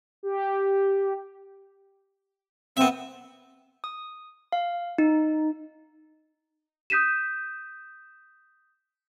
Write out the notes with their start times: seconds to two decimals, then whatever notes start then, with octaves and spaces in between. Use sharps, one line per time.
0.23 G4
2.77 B3 C4 E5
3.84 D#6
4.52 F5
4.98 D#4
6.90 D#6 G6 B6 D#7 E7